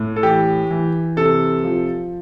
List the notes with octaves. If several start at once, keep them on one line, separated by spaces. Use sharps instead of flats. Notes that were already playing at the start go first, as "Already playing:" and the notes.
Already playing: A2
A4
E3 G4
E3
C3 A4
F3